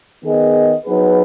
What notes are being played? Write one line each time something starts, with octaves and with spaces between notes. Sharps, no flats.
D#3 B3 G#4 D#5
F#3 B3 D#4 G#4 B4